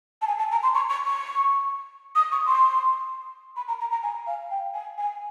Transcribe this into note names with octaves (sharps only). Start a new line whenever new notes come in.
A5
G#5
A5
A#5
C6
C#6
C#6
C#6
D#6
C#6
C6
B5
A#5
A#5
A#5
G#5
F5
G5
G#5
G#5